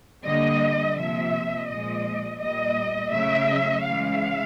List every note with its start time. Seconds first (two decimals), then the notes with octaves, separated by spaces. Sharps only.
0.25 D3 G3 A#3 D#5
0.97 C3 F3 A#3 E5
1.68 A#2 F3 G#3 D#5
2.40 A#2 G3 A#3 D#5
3.12 C#3 F#3 A3 E5
3.83 C#3 E3 G#3 F5